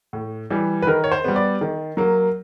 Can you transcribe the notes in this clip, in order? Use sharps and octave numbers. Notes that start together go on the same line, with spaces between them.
A2
E3 G3
B4
D#3 A#4
C#5
C5
G3 B3
D5
D#3
F#3 A#3